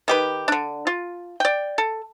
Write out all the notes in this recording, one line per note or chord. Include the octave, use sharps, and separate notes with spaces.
D#3 G4 B4
D3 D4
F4
D5 G5
A4